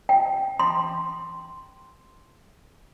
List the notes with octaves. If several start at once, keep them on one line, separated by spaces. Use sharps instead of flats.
G5
C6